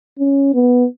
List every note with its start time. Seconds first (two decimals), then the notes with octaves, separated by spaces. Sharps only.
0.19 C#4
0.54 B3